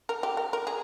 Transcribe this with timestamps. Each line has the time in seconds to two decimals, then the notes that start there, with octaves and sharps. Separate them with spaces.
0.09 A#4
0.23 G4
0.37 A#4
0.53 A#4
0.67 G#4